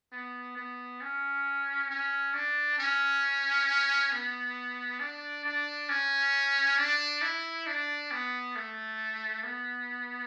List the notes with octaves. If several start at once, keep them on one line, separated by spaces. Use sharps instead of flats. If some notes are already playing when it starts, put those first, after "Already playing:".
B3
B3
C#4
C#4
D4
C#4
B3
D4
D4
C#4
D4
E4
D4
B3
A3
B3